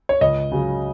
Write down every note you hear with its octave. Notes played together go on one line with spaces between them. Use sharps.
C#5
C#2 D#5
C#3 F#3